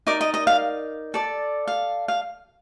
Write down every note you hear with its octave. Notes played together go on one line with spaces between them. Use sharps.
D#4 A#4 D5 D6
D#5
D#5
F5
A4 D5
F5
F5